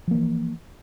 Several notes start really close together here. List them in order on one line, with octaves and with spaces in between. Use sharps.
F3 A#3 E3